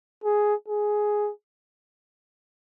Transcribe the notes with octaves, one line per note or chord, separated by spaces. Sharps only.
G#4
G#4